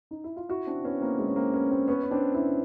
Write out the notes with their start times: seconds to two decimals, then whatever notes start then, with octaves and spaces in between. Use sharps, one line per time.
0.11 D#4
0.24 E4
0.37 F4
0.49 E4 F#4
0.67 C4 D4
0.84 B3 C#4
1.01 A#3 C4
1.19 G#3 A#3
1.28 C#4
1.36 A#3 C4
1.54 B3 C#4
1.71 A#3 C4
1.88 B3 C#4
2.03 C#4
2.11 C4 D4
2.34 D4 E4